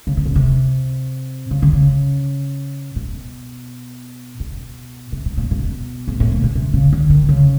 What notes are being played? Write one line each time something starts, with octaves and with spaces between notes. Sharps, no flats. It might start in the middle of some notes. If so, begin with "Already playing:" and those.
C#3
C3
B2
C3
C#3
D3
C#3
B2
B2
C3
B2
A#2
B2
G#2
A2
A#2
B2
C3
C#3
D3
D#3
C#3